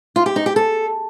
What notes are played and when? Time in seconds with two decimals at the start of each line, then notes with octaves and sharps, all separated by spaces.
0.16 F4
0.26 G4
0.36 D#4
0.46 G4
0.56 A4